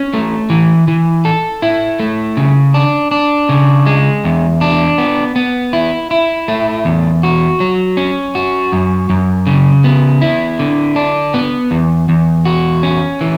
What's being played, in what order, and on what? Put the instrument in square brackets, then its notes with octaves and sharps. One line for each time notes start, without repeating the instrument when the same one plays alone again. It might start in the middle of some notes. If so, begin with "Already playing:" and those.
Already playing: [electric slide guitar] C#4
A3
E3
E3
A4
E4
A3
C#3
D4
D4
C#3
G#3
E2
D4
B3
B3
E4
E4
A3
E2
F#4
F#3
C#4
F#4
F#2
F#2
C#3
B3
E4
D3
D4
B3
E2
E2
F#4
C#4
E3